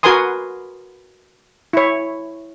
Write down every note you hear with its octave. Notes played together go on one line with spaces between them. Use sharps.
F#4 A#4 B4 G#5 C6 D#6
E4 C#5